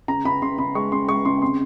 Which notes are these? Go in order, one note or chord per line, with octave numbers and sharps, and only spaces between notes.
C#3 A#5
C#3 B5
C#3 C6
C#3 B5
G#3 C#6
C#3 C6
G#3 C#6
C#3 C6
C3 C6